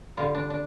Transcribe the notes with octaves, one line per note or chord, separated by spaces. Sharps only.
D3 G3 F4
D4
D4